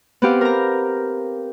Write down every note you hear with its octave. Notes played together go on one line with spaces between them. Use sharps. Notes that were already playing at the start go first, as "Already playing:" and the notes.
B3 C4 G4 F5
A#4 A#5